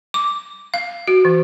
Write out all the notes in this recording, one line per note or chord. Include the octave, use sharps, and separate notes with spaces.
D6
F5
F#4
E3